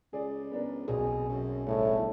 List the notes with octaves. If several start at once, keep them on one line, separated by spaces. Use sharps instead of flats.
C#2 G#4 D5
B3 D4 A#4
B1 B2 C4 G#4
F#2
G1 A2